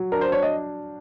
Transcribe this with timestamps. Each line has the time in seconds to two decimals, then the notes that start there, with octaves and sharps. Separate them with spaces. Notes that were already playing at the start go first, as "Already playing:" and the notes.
Already playing: F#3
0.12 D4 A#4
0.21 C5
0.32 D4 C#5
0.42 D#5